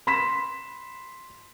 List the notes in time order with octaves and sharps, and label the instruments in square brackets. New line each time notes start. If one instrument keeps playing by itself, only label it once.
[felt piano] B5 C6 B6 E7